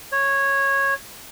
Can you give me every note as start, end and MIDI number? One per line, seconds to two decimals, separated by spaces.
0.12 0.94 73